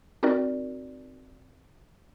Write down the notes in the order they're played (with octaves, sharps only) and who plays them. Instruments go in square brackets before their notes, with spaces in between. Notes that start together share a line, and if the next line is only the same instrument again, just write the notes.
[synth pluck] C4 D#4 F#4 A#4 D5